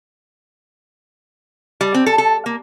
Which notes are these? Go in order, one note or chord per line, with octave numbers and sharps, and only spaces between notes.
G3
C4
A4
A4
A#3